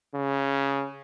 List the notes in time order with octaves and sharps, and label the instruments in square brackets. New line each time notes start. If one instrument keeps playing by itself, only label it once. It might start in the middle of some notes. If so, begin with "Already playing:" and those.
[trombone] C#3